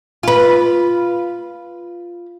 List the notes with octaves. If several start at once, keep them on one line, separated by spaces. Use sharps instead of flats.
F4 B4